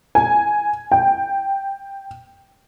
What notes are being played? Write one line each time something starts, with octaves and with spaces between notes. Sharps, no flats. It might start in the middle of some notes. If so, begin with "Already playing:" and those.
G#5
G5